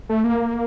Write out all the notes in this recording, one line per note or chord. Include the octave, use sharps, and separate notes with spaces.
A3
A#3